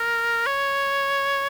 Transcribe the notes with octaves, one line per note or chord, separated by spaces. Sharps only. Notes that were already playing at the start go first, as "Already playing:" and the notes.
Already playing: A#4
C#5